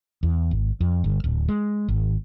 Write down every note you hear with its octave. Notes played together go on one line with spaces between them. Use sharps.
E2
G#1
F2
G1
D1
G#3
G#1